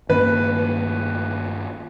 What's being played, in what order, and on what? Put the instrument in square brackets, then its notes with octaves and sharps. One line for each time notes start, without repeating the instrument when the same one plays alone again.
[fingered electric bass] G2 D#3 A#3 C#4 [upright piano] B4